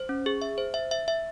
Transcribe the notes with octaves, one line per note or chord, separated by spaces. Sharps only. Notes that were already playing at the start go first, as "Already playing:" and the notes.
Already playing: C5
C#4
G#4
E5
C5
E5
E5
E5